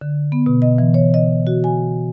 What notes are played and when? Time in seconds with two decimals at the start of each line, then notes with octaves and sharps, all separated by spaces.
0.01 D3
0.32 B3
0.46 B2
0.62 D#5
0.78 E3
0.94 C#5
1.14 D#5
1.47 F#4
1.64 G#5